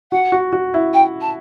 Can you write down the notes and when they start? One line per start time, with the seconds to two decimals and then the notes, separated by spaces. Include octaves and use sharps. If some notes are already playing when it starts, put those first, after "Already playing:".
0.11 F#4 F#5
0.32 F#4
0.53 F#4
0.74 E4
0.93 G5
1.21 A5